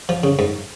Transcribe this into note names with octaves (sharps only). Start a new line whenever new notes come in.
F3
C#3
G#2